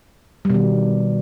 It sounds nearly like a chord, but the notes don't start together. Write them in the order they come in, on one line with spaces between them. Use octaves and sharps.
G3 B2 D#3